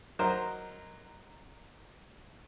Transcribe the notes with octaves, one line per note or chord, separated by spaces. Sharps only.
F#3 D#4 A#4 C5